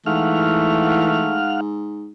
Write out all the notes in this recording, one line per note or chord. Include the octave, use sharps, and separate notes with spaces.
G#2 E3 A3 F5 F#5 F6